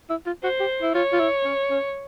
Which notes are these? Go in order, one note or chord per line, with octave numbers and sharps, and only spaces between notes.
E4
F4
F#4 C5
G4
E4
F4 C#5
F4
E4
C#4
C#4